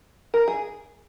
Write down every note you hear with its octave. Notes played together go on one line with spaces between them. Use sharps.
A#4
G#4